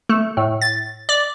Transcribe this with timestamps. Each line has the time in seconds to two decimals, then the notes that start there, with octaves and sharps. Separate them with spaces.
0.09 A3
0.37 A2
0.62 A6
1.09 D5